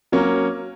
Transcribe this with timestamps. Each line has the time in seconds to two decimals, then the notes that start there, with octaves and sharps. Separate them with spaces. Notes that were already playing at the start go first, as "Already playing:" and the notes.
0.12 F#3 A#3 C#4